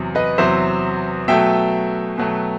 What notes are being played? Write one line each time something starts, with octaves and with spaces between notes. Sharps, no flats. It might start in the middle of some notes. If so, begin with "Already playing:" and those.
Already playing: E2 C3 F#3
B4 D#5
E2 C3 F#3 C5 E5
B2 F#3 A3 E5 G5
B2 F#3 A3